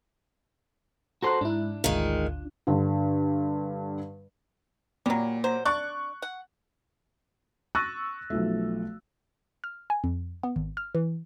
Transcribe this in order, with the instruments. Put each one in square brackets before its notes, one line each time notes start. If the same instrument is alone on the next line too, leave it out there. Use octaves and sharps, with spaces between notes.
[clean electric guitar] F#4 A4 C5 [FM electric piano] A#5 F#6
[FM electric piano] G#2 E4 [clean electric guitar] D4
[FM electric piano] G#1 D2 F4 [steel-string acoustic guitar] D#3 G#3
[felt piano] G2 D3
[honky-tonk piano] A#2 [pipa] F#3 G3
[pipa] F#3 C5
[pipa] D4 D5 [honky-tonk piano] C#6 F#6
[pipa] F#5
[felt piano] C#6 E6 F#6 A6 A#6 D#7
B1 F3 A3
[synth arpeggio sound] F6
G#5
F2
B3
G#1
F6
E3